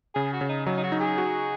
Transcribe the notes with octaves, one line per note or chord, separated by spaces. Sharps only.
C#3 G#4
F#4
C#3
D#4
F#3 D#4
D#4
F#4
D#4
G#4
F#4